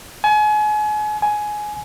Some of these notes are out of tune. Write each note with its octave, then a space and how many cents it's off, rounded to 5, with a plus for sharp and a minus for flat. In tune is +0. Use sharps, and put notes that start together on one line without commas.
G#5 +35
G#5 +15